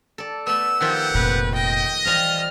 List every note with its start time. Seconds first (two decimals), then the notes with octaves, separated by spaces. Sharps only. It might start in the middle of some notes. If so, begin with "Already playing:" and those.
0.18 A4 D5
0.47 A3 B3 E6
0.81 D#3 F3 F4 G4 F#5
1.15 F1 A#2 B4
1.55 D#5 G5
2.06 E3 F3 G3 F6